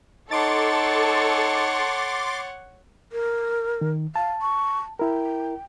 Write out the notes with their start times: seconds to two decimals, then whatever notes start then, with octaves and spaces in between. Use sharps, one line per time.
0.31 D#4 A4 C#5 F#5 C6 D6 A6
3.12 A#4
3.81 D#3
4.16 F5 A5
4.42 C#6
4.99 E4 A#4 G5